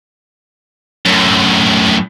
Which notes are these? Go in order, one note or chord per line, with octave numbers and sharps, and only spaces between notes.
F#2 A2